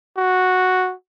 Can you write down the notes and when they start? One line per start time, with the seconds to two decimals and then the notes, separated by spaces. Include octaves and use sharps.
0.17 F#4